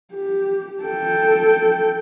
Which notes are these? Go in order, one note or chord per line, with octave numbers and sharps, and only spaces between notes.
G4
A4 G5